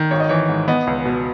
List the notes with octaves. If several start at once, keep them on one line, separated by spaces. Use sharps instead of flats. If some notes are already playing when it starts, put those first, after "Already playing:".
Already playing: D#3
G#1 C#5
D#5
E3 C#5
G#2
B3 D#5
C#2
B2